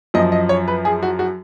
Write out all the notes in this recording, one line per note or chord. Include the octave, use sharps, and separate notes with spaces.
F#2 F3 D#5
D#5
C#5
B4
G#4
F#4
F#4